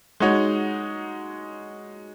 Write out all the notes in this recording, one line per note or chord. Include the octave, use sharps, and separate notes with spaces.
G#3 D#4 F#4 C#5